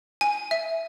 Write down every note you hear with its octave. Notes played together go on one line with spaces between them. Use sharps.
G#5
E5